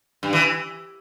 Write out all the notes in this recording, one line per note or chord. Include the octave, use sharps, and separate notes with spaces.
G2
E3